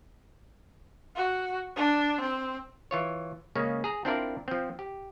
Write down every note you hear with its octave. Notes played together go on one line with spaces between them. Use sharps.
F#4
D4
C4
E3 F4 C#5
C#3 G#3 A#3 C#4
G#4 A#5
C4 D4 E4 F4 A#4 D5
F3 C4
G4